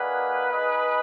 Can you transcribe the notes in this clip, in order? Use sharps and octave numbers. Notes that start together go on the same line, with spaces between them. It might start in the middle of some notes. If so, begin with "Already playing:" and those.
Already playing: A#3 D#4 G#4 B4 D5 F#5
D#4 G#4 D#5